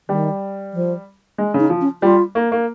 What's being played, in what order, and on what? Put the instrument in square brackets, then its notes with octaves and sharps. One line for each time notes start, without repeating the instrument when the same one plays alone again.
[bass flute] D#3 [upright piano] G3
[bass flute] F3
[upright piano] G#3
C#3
[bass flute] D#4
[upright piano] F3
[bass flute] C#4
[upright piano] G3 [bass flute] F4
[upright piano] A#3
A#3